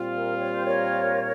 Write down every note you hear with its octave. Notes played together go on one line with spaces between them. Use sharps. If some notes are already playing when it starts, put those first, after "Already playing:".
Already playing: A#2 G3 C4 F4
A#4
C#5
C5
A#4 C#5